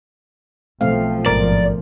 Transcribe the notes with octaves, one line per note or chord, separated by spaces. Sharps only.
B1 F3 A3 C4 F5
A1 G#2 A#4 D5